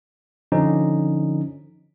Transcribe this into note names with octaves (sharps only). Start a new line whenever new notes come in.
D3 F3 C#4 D#4